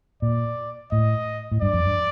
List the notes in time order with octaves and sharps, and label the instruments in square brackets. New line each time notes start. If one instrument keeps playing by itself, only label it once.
[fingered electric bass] A#2 [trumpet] D5
[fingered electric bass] A2 [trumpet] D#5
[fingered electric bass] A2
[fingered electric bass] G2 [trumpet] D5
[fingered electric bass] F2
G2